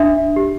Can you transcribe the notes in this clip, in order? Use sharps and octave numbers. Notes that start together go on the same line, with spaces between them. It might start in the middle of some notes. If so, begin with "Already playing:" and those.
Already playing: D4 E5
G4